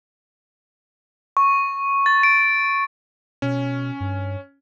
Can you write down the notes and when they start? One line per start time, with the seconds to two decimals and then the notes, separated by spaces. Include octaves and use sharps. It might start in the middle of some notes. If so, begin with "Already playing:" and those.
1.37 C#6
2.06 A6
2.23 D7
3.42 B2 C#4
4.00 G2